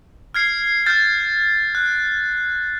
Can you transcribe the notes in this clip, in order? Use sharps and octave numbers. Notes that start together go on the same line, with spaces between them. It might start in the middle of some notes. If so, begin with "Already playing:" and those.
F6 G#6 C7
F6 G6 A6
F#6